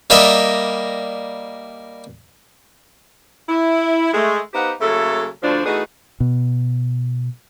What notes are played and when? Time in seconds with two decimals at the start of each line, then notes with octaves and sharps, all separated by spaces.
0.10 G3 A#3 A#4 D#5 E5
3.48 E4
4.13 G#3 A3
4.53 B3 D#4 G4 C5 F5 F#5
4.81 C#3 F#3 A3 A#3 A4
5.42 D2 F3 D4
5.65 E3 A3 B3 D#4 F#4 G#4
6.20 B2